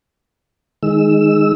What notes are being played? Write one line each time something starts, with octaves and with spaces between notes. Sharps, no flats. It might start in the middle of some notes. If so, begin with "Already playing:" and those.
D#3 G#3 E6